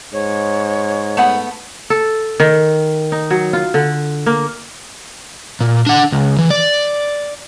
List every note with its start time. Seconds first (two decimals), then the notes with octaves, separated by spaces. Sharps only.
0.13 G#2 C#5
1.17 A3 B3 F#5
1.90 A4
2.40 D#3
3.12 D#4
3.30 F#3
3.53 F4
3.74 D3
4.26 A#3
5.61 A#2
5.86 D4 F#5
6.12 C#2
6.38 E3
6.50 D5